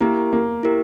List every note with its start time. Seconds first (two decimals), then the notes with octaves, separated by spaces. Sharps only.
0.01 A#3 E4 G4 A#4
0.33 A#3
0.63 E4 G4 A#4